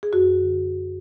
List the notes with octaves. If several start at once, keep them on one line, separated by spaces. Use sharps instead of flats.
G#4
F#2 F#4
D3